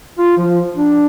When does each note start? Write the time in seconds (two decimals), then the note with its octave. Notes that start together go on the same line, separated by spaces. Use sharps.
0.18 F4
0.37 F3
0.76 D4